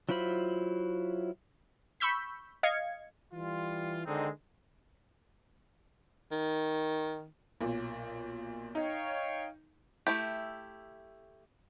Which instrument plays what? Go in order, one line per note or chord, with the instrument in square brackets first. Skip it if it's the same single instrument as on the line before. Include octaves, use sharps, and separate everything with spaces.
[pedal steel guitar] F#3 E4 F4 C5 B5
[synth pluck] B5 C#6 E6 G6 B6
D#5 F5 G#6 C#7
[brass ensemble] E3 G3 F4
D3 D#3 G#3 C4 D#4
[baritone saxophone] D#3
[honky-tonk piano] B1 A#2
[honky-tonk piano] D#4 [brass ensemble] C#5 F5 G5
[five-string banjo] A3 E4 G4